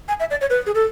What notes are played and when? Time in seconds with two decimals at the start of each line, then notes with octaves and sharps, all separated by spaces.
0.08 G#5
0.20 E5
0.31 D5
0.41 C#5
0.50 B4
0.66 G#4
0.75 A4